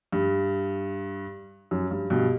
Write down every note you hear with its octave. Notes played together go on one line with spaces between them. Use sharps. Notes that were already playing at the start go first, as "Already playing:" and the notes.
G2
F#2
G2
G2 B2